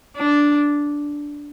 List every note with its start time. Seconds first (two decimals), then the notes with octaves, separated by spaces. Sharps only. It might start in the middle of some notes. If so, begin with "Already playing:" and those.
0.17 D4